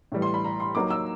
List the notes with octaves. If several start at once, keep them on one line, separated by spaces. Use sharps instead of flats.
A2 E3 G3
C6
B5
A#5
C6
F#3 A#3 D#4 D6
E6